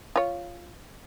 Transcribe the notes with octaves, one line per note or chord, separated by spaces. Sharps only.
F4 C#5